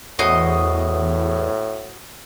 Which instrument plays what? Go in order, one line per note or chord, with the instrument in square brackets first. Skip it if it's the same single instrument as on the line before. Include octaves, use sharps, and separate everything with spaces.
[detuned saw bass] E2 [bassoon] A2 [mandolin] F#4 C5 D#5